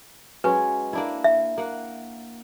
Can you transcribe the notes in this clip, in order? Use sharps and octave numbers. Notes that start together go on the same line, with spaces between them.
F#3 G#3 C#4 B4
A#3 D4 E4
E5
A#3 F#5